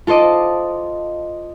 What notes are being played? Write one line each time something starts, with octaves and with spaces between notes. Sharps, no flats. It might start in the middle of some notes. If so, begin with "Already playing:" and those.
F4 A4 C5 D#5 D6